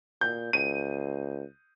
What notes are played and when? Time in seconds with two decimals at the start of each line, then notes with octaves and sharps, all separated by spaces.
0.21 A#2 G6
0.53 C#2 D#7